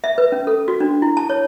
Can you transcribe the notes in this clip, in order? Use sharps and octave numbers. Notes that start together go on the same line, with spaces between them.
E5
B4
C#4
A4
F#4
D4
E4
A5
C#5